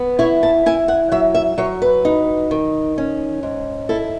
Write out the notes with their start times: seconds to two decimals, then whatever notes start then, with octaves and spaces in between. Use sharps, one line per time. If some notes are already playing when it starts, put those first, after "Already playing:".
Already playing: B3
0.19 E4 C#5
0.43 A5
0.66 E4 G#5
0.88 F#5
1.12 F#3 E5
1.34 E5
1.58 F#3 C#5
1.82 B4
2.05 D#4
2.51 D#3
2.98 C#4
3.43 G#2
3.89 E4 A4